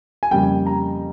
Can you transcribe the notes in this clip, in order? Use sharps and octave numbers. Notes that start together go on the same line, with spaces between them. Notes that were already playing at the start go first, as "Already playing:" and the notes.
G#5
F2 C#3 G3 A#3 G5
A#5